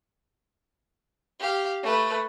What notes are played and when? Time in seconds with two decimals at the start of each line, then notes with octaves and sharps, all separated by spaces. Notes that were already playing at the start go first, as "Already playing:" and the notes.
1.40 G4 F5
1.83 A3 B4